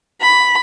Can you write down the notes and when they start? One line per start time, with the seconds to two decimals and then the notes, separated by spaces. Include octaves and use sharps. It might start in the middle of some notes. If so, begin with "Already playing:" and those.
0.22 B5